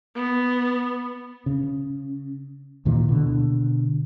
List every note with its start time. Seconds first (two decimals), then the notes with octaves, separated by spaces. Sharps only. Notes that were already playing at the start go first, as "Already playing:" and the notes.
0.15 B3
1.46 C#3
2.85 D2 A#2 D#3 E3
3.09 B2 D3